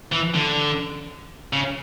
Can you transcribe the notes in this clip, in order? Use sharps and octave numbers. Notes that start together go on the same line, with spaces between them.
E3
D3
C#3